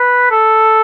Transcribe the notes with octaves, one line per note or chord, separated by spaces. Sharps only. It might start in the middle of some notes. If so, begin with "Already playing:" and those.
Already playing: B4
A4